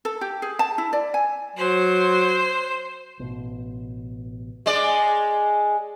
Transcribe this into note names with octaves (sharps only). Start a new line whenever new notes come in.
A4
G4
G#4
A5
E4
D5
G#5
F#3 C5
A1 B2
G#3 D5